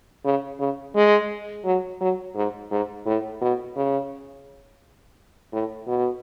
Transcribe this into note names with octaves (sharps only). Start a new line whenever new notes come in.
C#3
C#3
G#3
F#3
F#3
G#2
G#2
A2
B2
C#3
A2
B2